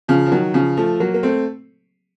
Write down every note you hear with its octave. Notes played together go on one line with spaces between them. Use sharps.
C#3 F3
F3
D#3 F#3
C#3 F3
F3 A3
F#3 A#3
A#3
A3 C4